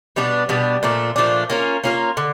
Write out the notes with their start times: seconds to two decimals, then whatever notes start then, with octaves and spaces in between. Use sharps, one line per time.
0.16 B2 G3 B3 D4
0.49 B2 G3 B3 D4
0.83 A#2 F3 A3 D4
1.16 A#2 F3 A3 D4
1.50 A#3 C#4 F4 A#4
1.84 A#3 C#4 F4 A#4
2.17 D3